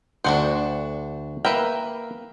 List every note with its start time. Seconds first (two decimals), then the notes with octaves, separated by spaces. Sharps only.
0.24 D2 D4 F#4 C5 F#5 G5
1.45 A#3 A#4 B4 E5 G5